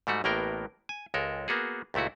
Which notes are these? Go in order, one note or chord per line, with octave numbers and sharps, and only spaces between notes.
G#2 G3 A3 F#4
A1 A2 A#3 B3 A#4 G5
G#5
C#2 G#3 A4 A#4
A#3 B3 F#4 G#4
C#2 A#2 A3 E4 F#4